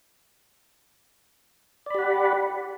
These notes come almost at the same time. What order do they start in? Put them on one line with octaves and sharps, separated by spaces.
D5 B5 G4 F#5